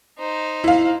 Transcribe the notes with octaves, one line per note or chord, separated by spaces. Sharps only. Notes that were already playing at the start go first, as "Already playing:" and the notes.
D#4 C5
E4 F5